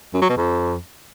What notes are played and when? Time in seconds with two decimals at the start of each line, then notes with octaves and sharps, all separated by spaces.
0.14 F#2
0.21 F#3
0.29 B2
0.37 F2